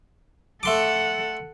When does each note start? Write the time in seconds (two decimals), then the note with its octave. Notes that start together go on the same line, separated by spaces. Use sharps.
0.63 A3 A4 F#5 C6 D6